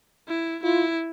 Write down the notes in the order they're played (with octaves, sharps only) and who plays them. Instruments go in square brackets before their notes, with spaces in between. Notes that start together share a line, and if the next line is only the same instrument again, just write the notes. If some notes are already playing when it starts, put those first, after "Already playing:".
[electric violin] E4
[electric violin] E4 [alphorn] F4